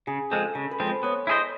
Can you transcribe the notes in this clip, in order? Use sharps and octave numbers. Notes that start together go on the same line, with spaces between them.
C#3 G#4
F3 G#3 C4 A4
C#3 A4
B4
F3 G#3 C4
C5
B3 C#5
E4 G#4 C5 D#5